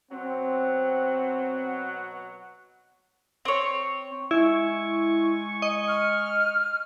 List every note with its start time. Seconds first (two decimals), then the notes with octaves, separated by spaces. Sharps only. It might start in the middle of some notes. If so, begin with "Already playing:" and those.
0.12 B2 F#3 C4 F#5
3.45 C4 C#5
4.31 G#3 E4 G#5 C#6
5.62 D#5
5.88 F6